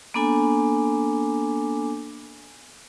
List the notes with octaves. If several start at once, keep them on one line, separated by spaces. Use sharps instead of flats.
A#3 B3 D4 A4 G#5 D6